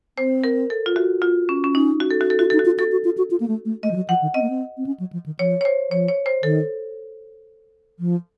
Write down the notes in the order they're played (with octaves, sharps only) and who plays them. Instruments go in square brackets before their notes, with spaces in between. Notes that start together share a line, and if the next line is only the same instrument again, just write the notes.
[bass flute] C4 [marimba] C5
[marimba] A#4
A4
F4
F#4
F4
C#4
C#4
[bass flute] C#4 [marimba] D#4
[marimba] F#4
A4
F#4
A4
[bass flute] F4 [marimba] F#4
[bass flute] D#4 [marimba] A4
[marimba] F#4
[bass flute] F4
[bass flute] F#4 [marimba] A4
[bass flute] F#4
F4
F#4
F4
A#3
A3
A3
[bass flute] A3 [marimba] D#5
[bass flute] F3
F#3
[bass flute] F3 [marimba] F#5
[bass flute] D#3
[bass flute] C4 [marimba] D#5
[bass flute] A#3
C4
C4
C#4
F#3
F3
D#3
[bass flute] F3 [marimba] C#5
[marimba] C#5
C5
[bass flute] F3 [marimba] C#5
[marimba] C#5
C5
[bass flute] D#3 [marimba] A4
[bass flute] F3